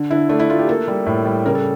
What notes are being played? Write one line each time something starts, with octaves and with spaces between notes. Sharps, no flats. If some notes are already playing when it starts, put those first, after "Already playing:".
Already playing: D3
D3 E4
A3 D4
E4
A3 F4
G4
A#3 A4
G3
A2
G3
C#3 A#4
A4